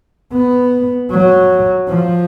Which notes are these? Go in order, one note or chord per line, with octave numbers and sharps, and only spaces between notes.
B3
F#3
F3